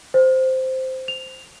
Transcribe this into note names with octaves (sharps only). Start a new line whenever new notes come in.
C5
F7